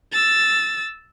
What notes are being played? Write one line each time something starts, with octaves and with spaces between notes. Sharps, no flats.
E6 A6